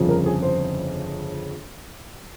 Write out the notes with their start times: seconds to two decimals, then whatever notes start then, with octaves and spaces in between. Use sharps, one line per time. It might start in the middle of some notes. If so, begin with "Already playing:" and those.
Already playing: G1 F2 C#3 F3
0.09 A#4
0.26 G#4
0.42 C5